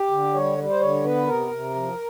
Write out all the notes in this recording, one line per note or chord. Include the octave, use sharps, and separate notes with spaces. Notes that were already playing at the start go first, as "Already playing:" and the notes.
Already playing: G4
D3
G3 C#5
G3
C5
D3 C#5
B3 B4
C3 A#4
C3
F3